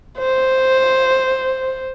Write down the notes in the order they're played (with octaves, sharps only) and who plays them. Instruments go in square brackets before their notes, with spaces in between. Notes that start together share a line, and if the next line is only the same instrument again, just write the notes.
[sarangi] C5